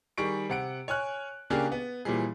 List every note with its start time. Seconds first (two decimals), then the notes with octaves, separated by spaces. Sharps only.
0.18 D#3 G3 G#4 C#6 D7
0.49 C3 F#5 D7
0.88 C#5 G#5 F6 F#6
1.50 C#3 A#3 C#4 D4 G4 G#4
1.72 B3
2.05 A#2 E3 F3 G3 G#4